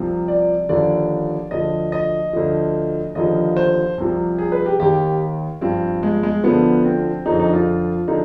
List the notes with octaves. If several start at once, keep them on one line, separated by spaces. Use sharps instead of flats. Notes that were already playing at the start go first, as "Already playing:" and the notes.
Already playing: C2 C3 F3
D5
D#2 D3 F3 D5
D2 D3 F3 D#5
D#5
D2 D3 F3
D#2 D3 F3 D#5
C5
C2 C3 F3
G#4
B4
G4
D#2 D#3 G4
G2 F3 C4
G#3
G#3
D2 D3 F3 B3
C4
F2 D3 F3 D#4
D#4
F4
D3 F3 D#4